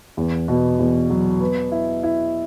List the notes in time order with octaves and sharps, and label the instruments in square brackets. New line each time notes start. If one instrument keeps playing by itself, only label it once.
[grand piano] E2
B2
E2
F#3
B3
E4
E4